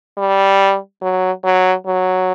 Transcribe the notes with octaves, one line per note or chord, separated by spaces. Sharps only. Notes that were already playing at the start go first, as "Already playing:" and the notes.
G3
F#3
F#3
F#3